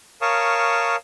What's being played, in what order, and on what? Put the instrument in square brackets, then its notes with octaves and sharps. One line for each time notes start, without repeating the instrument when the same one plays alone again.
[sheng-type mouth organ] A#4 C#5 F5 A5 C#6 D#6